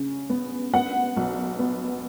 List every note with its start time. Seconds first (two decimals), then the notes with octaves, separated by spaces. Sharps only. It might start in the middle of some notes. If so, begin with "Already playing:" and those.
Already playing: C#3
0.30 B3
0.73 B3 F#5
1.17 B1
1.59 B3